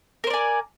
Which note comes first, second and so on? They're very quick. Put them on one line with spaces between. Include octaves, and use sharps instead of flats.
A#4 C5 D5 G#5